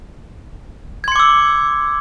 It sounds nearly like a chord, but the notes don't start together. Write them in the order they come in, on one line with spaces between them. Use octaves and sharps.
G#6 C6 C#7 D6 E6